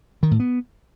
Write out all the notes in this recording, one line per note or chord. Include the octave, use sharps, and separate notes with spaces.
D#3
A2
B3